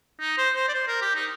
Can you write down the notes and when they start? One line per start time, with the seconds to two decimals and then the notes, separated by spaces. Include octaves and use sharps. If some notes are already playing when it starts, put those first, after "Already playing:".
0.20 D#4
0.38 C5
0.55 C5
0.69 D5
0.74 C5
0.87 A#4
1.01 G4
1.15 D#4